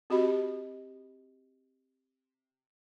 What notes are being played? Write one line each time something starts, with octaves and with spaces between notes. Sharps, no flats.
C4 F#4 G4 D#5 B5